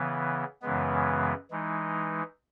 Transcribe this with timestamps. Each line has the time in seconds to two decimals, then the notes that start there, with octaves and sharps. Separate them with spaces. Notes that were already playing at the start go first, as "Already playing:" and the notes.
Already playing: C#3 E3 B3
0.62 F#2 C#3 E3 G#3 B3
1.51 E3 G#3 D#4